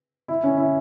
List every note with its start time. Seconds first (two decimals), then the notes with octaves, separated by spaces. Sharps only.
0.28 E4
0.43 C#4
0.57 E4